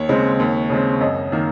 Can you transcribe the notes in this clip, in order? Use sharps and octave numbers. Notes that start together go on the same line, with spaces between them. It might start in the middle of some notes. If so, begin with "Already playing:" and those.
Already playing: D#2 C#5
C#3 G#3 C4
D#2
C#3 G#3 C4
F#2 D#5
D#3 A#3